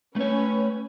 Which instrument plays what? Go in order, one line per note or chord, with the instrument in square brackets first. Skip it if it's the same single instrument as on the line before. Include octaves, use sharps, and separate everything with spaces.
[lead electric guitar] A3 C#5 [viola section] C#4 B4